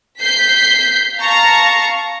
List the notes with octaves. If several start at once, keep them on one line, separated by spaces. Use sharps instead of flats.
G6 B6 C7
F5 A5 A#5 C#6